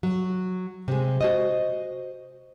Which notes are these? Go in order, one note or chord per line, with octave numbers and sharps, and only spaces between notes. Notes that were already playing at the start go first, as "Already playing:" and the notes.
F#3
C3 G#3
F#4 C5 D#5